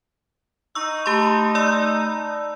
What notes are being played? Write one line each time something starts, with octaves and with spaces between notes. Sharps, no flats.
D#4 C#6 E6
A3 G4 A5 B5 C6
D5 E6